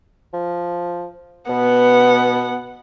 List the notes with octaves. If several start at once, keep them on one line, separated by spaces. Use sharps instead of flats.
F3
B2 B3 F#5